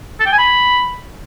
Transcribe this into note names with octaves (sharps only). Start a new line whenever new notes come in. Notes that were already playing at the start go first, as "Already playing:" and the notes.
A4
G5
G#5
B5